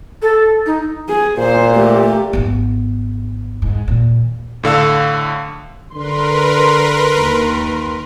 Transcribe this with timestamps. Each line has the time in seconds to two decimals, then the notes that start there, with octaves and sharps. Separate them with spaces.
0.22 A4
0.66 D#4
1.09 G#4
1.38 A#2 C5
1.74 A3 G4
2.33 G#1 B3
3.62 G#2
3.88 D#2 A#2
4.63 A2 D3 F5 E6
5.94 D3 A#4 B4 C6
7.20 D#2